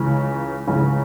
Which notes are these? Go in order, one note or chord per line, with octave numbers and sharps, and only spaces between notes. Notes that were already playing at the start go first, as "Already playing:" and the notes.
Already playing: C#2 C#3 E3
C#2 C#3 E3